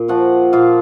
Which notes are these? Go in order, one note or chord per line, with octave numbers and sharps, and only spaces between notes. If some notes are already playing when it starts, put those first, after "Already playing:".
Already playing: A#2
F3 F#4 F#5
A#2 F4 F5